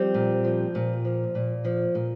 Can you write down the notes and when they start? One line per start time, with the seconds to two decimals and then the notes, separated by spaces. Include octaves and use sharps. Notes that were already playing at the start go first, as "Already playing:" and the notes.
Already playing: F3 G3 C4
0.14 A#2
0.44 F3
0.75 A#2
1.05 F3
1.35 A#2
1.65 F3
1.95 A#2